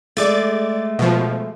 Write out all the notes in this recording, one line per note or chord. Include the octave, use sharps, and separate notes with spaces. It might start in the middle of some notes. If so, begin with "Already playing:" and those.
G#3 A3 D5 D6 A6
B2 F3